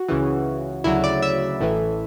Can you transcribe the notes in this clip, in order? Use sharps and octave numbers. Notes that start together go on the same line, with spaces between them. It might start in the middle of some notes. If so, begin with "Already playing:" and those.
Already playing: F#4
C#2 C#3 E3
D2 C#3 F#3 E4
D5
E5
A1 A2 E3